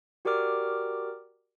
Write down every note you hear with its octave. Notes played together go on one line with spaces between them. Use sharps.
F#4 G4 A#4 D5 D6 F6